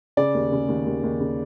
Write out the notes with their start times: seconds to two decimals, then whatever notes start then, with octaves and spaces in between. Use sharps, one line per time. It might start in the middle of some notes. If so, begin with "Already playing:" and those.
0.17 C#3 D5
0.34 D#2
0.52 C#3
0.69 D#2
0.86 D#2
1.03 D#2
1.20 C#3